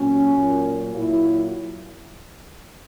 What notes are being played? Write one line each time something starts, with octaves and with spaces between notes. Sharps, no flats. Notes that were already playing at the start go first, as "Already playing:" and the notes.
Already playing: A#2 F#3 C#4
A#2 F#3
A#2 F#3 E4